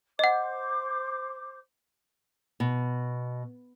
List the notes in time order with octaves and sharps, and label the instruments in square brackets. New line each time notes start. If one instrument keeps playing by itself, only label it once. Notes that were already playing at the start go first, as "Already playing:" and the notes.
[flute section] C5 D6 [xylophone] D#5 F#5
[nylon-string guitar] B2